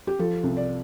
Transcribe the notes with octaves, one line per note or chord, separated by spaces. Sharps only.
G4
F3 A4
C2
D5